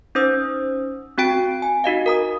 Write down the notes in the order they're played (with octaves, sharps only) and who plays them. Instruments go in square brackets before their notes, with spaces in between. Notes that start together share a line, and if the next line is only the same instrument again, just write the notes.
[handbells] C#4 D#4 C5 D#6 E6
C4 F#4 G5 D7
G#5
D#4 F#4 D#5 F5
A#4 A#5 D#6